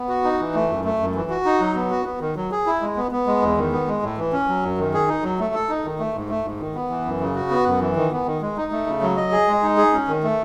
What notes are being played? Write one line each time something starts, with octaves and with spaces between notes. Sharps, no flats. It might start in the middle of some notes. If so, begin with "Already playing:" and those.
Already playing: B3
F#4
D#4
E3
A3
F#2
A3
F#2
E3
F#4
D#4
F#3
B3
F#4
B3
D#3
F#3
G#4
E4
G#3
B3
B3
G#3
E2
D#3
B3
G#3
A2
E3
C#4
F#3
F#2
D#3
G#4
D#4
F#3
A3
A4
D#4
D#3
A3
G#2
A3
G#2
D#3
B3
E3
F#2
C#3
F#4
B3
F#2
E3
D#3
B3
D#3
G#3
D#4
A3
C#3
F#3
D#5
G#4
G#3
D#4
G#4
C#4
D#3
A3